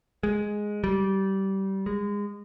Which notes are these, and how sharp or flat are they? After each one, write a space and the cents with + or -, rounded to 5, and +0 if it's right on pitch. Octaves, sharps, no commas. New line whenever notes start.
G#3 +0
G3 -20
G#3 -25